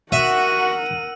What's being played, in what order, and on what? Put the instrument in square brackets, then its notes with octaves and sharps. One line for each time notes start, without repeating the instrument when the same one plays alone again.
[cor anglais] F#4 [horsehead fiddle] A#4 F#5 [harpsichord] E5 [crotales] E6 D#7